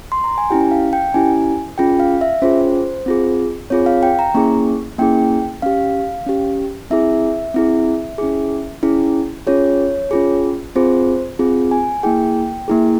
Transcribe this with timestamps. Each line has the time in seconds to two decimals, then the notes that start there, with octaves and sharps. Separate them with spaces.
0.12 C6
0.24 A#5
0.38 G#5
0.50 C#4 E4 G4 G5
0.71 F5
0.93 G5
1.14 C#4 E4 G4 G#5
1.78 C#4 F4 G#4 G5
2.00 F5
2.21 E5
2.42 C#4 F4 G#4 C5
3.06 C4 F4 G#4
3.70 C4 F4 G#4 C#5
3.86 F5
4.03 G5
4.19 A#5
4.34 A#3 C#4 E4 G#4 C#6
4.98 A#3 C#4 E4 G#4 G5
5.62 C#4 G4 F5
6.26 C#4 G4
6.90 C4 E4 G#4 E5
7.54 C4 E4 G#4
8.18 C#4 E4 G#4
8.83 C#4 E4 G#4
9.47 C#4 F4 G#4 C#5
10.11 C#4 F4 G#4
10.75 C4 F4 G#4 C5
11.39 C4 F4 G#4
11.71 G#5
12.03 A#3 E4 G#4 G5
12.68 A#3 E4 G#4